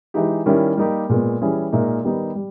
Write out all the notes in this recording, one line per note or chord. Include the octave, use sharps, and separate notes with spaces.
E3 G#3 D#4 G4
D#3 G3 C#4 E4
G3 A#3 D#4 G4
A#2 G#3 B3
E3 G3 C#4 G#4
A#2 G#3 D#4 A#4 E5
D#3 G3 B3 D#4 G4
G3